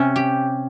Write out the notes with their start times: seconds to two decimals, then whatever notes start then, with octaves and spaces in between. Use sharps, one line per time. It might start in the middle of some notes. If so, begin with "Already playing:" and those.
Already playing: C3 C#4
0.16 G4